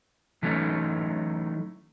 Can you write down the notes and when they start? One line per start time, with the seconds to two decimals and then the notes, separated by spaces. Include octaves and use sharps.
0.43 E3 F#3 A3 C#4 D#4